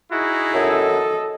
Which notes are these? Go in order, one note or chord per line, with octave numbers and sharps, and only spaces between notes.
D#4 E4 F#4 G#4
F#2 A4 D#5